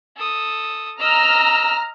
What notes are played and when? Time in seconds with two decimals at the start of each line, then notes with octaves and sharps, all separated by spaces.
0.17 A4 D#6
1.00 D#5 A#5 E6 F6